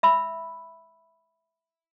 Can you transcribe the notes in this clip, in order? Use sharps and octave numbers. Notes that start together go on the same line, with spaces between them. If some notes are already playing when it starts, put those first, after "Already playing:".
E5 B5 E6